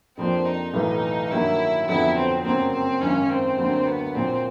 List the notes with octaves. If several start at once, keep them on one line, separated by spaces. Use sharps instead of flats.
F2 C3 F3 A#3 C4 D4
D#4
B1 A2 E3 D#4
G2 D#3 F#3 A#3 E4
F2 D3 F#3 B3 E4
C4
F#2 C#3 F#3 A#3 C4
C4
G#1 F#2 D#3 C#4
C4
D2 D3 F#3 A#3
B3
A#2 F#3 A#3 C4